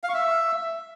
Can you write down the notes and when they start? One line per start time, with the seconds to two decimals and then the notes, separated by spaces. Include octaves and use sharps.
0.04 F5
0.09 C#6
0.14 E5